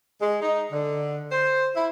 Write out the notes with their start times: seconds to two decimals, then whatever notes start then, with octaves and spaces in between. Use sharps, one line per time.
0.21 G#3
0.42 D#4
0.72 D3
1.32 C5
1.76 E4